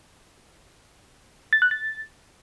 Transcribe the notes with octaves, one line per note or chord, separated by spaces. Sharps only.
A6
F#6
A6